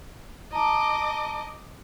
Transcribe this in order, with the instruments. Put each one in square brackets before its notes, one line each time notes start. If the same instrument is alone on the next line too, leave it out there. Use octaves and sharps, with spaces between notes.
[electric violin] D#5 D6 [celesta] A5 A#5